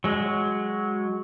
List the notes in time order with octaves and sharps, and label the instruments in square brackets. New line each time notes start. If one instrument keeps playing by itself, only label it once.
[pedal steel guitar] F#3 G#3